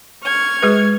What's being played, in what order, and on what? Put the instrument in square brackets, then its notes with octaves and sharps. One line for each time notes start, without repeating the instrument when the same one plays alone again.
[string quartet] C#6 F6 G#6
[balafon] G#3 G#4 B4